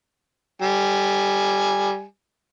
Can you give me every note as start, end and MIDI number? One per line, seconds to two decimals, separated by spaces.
0.62 2.03 55
0.62 2.03 80